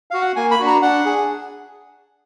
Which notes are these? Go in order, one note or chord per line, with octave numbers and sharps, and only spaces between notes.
F#4 F5
F#5
A#3 G#5
B5
D4 F#4
A#5
D4 F#5
G#4